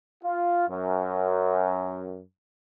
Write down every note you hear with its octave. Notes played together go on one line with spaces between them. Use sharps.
F4
F#2